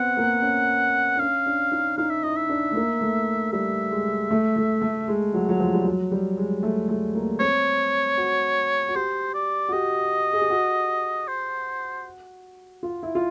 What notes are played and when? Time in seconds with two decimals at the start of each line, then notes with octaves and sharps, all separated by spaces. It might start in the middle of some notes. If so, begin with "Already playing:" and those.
Already playing: B3 C4 F#5
0.17 A#3
0.42 C#4
1.16 D4
1.20 C#4 F5
1.46 D4
1.72 D#4
1.98 D#4 F5
2.10 E5
2.23 E4 D#5
2.36 E5
2.49 D4
2.71 A3
2.76 A#3
3.01 A3
3.52 G3 E5
3.92 G#3
4.31 A3
4.56 A3
4.82 A3
5.08 G#3
5.34 F#3
5.49 F#3
5.60 F3
5.74 G3
5.85 F#3
6.12 G3
6.37 G#3
6.63 A3
6.89 A3
7.15 A#3
7.40 C4 C#5
8.18 F#4
8.88 F#4
8.95 G4 C5
9.34 D5
9.69 F#4
9.72 G4 D#5
10.33 G#4
10.42 G4
10.50 F#4
11.28 C5
12.83 F4
13.03 E4
13.15 F4